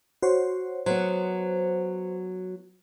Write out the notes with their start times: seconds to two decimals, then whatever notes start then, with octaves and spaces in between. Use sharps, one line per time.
0.22 F#4 C5 C#5
0.86 F#3 B3 C5